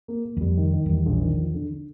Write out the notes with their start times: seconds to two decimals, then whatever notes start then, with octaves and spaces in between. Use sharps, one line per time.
0.08 A#3
0.25 A#3
0.37 E2
0.41 F2 G3
0.57 D#3
0.74 D#3
0.86 F2
0.89 E2 G3
1.06 A#1
1.22 D#3
1.38 F3
1.54 D3
1.70 D3